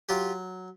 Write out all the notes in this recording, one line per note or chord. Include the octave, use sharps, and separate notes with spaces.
F#3 F4 G4